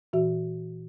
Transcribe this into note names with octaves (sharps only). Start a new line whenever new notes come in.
A#2 E3 F#4 E5